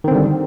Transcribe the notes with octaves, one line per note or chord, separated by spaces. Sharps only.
D3 D#3 G3 C4